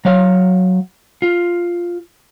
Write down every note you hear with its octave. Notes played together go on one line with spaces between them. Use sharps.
F#3 C#5 F5
F4